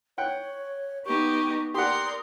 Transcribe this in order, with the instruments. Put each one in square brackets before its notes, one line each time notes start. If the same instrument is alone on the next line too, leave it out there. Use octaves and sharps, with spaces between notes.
[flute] C#5 [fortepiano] F#5 G5 F#6
[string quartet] B3 D#4 G4 [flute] C#6
[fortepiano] G4 F#5 [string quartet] A#4 D5 [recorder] C6 [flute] D#6